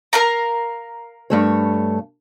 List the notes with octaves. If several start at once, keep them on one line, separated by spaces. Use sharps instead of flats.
A#4 F5 A#5
G2 A3 C#5